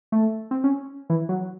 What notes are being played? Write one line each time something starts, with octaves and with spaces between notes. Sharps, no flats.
A3
C4
C#4
E3
F#3